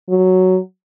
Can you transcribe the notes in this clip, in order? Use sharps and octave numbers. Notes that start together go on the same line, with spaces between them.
F#3